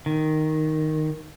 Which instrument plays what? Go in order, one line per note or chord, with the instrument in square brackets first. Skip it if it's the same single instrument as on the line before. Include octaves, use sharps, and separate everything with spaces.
[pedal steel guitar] D#3